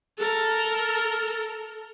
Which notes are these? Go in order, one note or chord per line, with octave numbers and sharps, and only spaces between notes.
A4 A#4